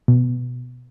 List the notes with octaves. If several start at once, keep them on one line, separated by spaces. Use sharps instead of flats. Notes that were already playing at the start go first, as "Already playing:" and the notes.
B2